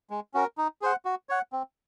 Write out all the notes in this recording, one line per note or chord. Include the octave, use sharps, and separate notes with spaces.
G#3
C#4 F#4 A#4
D#4
G#4 C5 F#5
F#4
C#5 F#5
C4